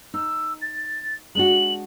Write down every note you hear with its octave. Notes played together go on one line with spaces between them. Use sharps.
D#4 E6
A6
G#3 D4 F#4 F#7